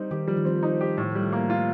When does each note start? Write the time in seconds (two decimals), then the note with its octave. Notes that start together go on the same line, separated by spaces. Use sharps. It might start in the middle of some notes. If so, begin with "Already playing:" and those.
Already playing: G3 C4 D#4
0.11 D#3 G4
0.27 F3 G3
0.37 D#3
0.45 F3 C4
0.63 D#4
0.81 G4
0.97 A2 A3
1.15 G3
1.32 A#3
1.50 F4